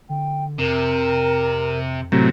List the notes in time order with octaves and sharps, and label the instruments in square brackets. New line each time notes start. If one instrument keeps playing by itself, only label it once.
[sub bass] D3 [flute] G5
[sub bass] F2 [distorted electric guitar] C3 [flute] A#4
[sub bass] F1 [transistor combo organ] A2 C3 F#3 [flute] A#5